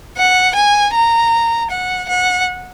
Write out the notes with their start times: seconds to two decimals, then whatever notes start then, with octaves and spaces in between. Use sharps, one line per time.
0.17 F#5
0.56 G#5
0.94 A#5
1.70 F#5
2.09 F#5